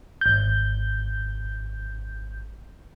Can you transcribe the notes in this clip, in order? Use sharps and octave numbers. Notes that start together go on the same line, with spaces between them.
G#1 G6